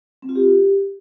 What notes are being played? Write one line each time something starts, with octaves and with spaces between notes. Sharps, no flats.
C4
F4
G4